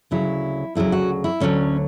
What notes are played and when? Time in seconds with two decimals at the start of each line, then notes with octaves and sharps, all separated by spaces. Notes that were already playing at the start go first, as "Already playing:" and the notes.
0.11 D2 C#3 F#3 E4
0.75 D2 C#3 F#3 E4
0.92 F#4
1.24 E4
1.40 D2 D3 F#3 C#4